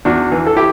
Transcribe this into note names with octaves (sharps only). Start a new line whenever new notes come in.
E2 D4 F#4
E3
A4
E4 G4